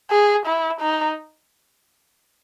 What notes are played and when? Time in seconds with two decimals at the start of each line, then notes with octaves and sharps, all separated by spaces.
0.11 G#4
0.46 E4
0.80 D#4